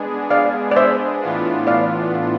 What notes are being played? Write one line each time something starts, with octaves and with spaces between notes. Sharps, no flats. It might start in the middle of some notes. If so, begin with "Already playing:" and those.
Already playing: G#3 B3 D4 G#4
D5 F5
D5
C5 E5
A2 E3 B3 D4 F4
D5 F5